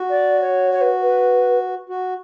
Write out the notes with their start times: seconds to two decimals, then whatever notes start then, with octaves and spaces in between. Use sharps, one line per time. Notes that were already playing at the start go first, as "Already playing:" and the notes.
Already playing: F#4
0.09 D5
0.41 C#5
0.72 C#5
0.81 B4
1.01 B4
1.89 F#4